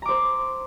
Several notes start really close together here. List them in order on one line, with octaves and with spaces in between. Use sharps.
A#5 D6 C5